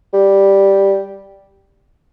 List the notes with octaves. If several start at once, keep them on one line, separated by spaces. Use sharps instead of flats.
G3